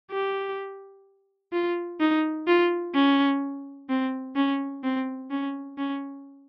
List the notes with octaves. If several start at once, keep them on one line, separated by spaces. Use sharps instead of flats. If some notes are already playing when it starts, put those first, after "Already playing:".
G4
F4
D#4
F4
C#4
C4
C#4
C4
C#4
C#4